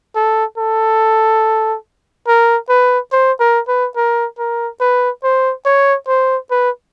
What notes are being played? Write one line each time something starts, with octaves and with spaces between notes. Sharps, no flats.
A4
A4
A#4
B4
C5
A#4
B4
A#4
A#4
B4
C5
C#5
C5
B4